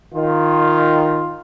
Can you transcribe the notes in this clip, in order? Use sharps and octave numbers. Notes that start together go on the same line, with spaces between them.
D#3 F4